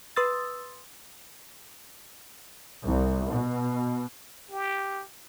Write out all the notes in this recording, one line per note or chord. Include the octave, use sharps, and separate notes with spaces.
B4 C6 D#6 E6 A6
C2
B2
G4